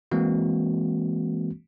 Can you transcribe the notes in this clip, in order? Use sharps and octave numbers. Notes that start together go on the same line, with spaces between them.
E3 G#3 A#3 C4 F#4